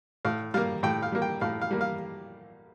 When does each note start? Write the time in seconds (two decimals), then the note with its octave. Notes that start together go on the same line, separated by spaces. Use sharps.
0.25 A2 F5
0.54 G3 A#3 F5
0.83 A2 G5
1.02 F5
1.12 G3 A#3
1.22 G5
1.41 A2 F5
1.62 F5
1.71 G3 A#3
1.81 F5